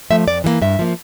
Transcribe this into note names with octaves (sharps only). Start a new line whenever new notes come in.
F3 A3 E5
F2 D5
E3 G3 A#3
G2 E5
F3 A#3